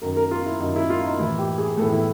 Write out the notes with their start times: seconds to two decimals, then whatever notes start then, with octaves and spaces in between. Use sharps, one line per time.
0.02 F#2 D#3 A#4
0.17 A#4
0.31 F4
0.46 E4
0.60 F#2 D#3 D#4
0.76 E4
0.90 F4
1.05 D#4
1.19 A2 E3 E4
1.39 G4
1.58 G#4
1.77 A2 E3 A4
1.92 E4